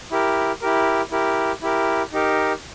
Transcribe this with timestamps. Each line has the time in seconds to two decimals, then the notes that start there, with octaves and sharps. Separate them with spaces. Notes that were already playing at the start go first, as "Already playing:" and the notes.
0.11 E4 G4 A#4
0.61 E4 G4 A#4
1.11 E4 G4 A#4
1.62 E4 G4 A#4
2.12 D#4 G4 A#4